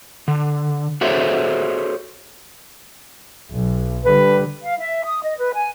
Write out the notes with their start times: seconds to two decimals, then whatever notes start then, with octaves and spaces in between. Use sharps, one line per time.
0.28 D3
1.01 F#4 G#4 A4 C5 C#5 E5
3.52 B1
4.05 D3 G3 B4
4.62 F5
4.79 E5
5.04 D#6
5.22 D#5
5.37 B4
5.54 G#5